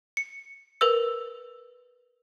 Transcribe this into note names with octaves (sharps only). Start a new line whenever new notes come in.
C#7
A#4 B4 E6